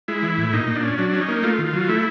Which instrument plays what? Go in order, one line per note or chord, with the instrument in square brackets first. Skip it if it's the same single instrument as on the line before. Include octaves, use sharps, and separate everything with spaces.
[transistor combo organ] G#3 E4
E3
A2
A#2 D#4
A#2
D4
C#4
F#3 D4
C#4
D#4
A#3
A3 F4
D#3
F4
F#3
A3 E4